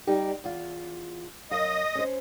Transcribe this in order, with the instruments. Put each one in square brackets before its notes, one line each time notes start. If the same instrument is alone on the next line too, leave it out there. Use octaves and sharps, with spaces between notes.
[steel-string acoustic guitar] G3 D#4 G4
E2 F4
[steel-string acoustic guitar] F#2 F5 [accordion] D#5 D#6
[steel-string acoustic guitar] C#4 C5